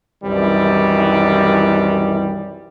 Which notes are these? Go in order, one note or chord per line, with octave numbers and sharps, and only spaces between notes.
C2 F#2 C3 D#3 E3 G3